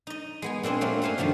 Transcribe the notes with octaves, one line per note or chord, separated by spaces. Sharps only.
D#4 D#5
G#3 B3 G#5
A#2 G#3 C4 D4 C5
F#3 A3 A#3 C#4 D4
G2 A3 C5 F5 G#5
G2 D3 D#3 F3 F#3